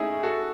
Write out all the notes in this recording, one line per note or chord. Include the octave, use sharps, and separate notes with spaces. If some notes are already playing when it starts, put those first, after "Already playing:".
Already playing: A3 C#4 D#4 E4 G#4
F#4 A4